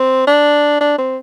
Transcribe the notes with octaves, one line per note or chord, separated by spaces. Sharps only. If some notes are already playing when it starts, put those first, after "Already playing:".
Already playing: C4
D4
D4
C4